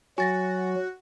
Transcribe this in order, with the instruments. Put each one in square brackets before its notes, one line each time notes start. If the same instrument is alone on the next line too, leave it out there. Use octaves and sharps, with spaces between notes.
[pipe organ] F#3 [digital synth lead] F#4 [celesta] G#5 A6 A#6